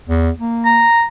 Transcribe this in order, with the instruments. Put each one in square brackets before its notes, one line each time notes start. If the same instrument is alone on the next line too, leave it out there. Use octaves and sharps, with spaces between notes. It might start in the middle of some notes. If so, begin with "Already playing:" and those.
[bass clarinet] E2
A#3
[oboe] A#5